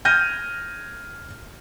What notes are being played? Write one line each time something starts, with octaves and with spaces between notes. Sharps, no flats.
F6 G6 G#6 A#6 D#7